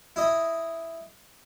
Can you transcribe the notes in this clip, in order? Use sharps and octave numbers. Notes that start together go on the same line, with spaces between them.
E4 D#5